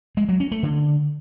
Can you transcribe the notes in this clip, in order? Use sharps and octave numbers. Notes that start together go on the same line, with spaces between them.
G#3
F#3
C#4
A3
D3